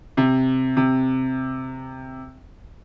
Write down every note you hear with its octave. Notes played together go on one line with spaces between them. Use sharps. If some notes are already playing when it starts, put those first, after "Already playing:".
C3
C3